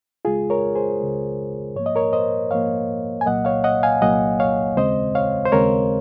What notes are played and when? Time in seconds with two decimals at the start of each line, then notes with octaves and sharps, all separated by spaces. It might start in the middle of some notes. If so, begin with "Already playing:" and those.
0.25 C#2 C#3 G#3 F4 G#4
0.50 A#4 C#5
0.75 G#4 C5
1.00 C#2 C#3 G#3
1.76 G#2 F3 A#3 C#5
1.86 D#5
1.96 A#4 C#5
2.13 C5 D#5
2.51 G#2 F3 A#3 C#5 F5
3.21 G#5
3.26 C2 A#2 F#3 A#3 D#5 F#5
3.45 C#5 F5
3.64 D#5 F#5
3.83 F5 G#5
4.02 C2 A#2 F#3 A#3 D#5 F#5
4.40 C#5 F5
4.77 D#2 C#3 G#3 C4 C5 D#5
5.15 C#5 F5
5.46 C5
5.52 D#2 C#3 G#3 C4 A#4 C#5